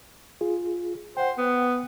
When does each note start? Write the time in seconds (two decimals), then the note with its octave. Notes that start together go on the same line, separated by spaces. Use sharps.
0.41 F4 G#4
1.17 C5 F#5 G5
1.38 B3